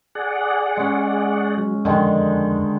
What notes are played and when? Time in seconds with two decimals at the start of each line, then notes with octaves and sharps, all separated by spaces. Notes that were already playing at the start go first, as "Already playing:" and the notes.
0.15 G#4 D5 F#5
0.77 G#3 C#4
1.57 F#3
1.85 F2 D3 D#3 G#3